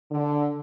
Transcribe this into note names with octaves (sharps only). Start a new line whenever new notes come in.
D3